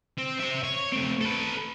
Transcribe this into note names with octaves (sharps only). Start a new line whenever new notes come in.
C4
C5 E5
C#5
A3 C4
A4 B4